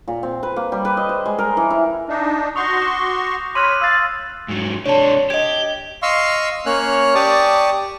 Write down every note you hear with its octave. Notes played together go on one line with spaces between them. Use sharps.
A#2
C4
B4
A#3
G3
B4
D#5
C5
G#3
A#4
E3
E4
D4 D#4
F#4 C6 C#6 D#6 G6 A#6
D6
C#5 B5 C6 D6 F6 F#6 D#7 F#7
F5 E6 A6
G#2 F#3
C3 D4 C#5 A5
G4 D#5 G#6
D#5 F5 C6 C#6 E6
A#3 C#4 C#5 F6 F#6
G4 D5 A5 C#6 D#6